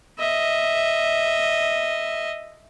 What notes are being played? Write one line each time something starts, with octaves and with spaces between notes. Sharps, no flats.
D#5 E5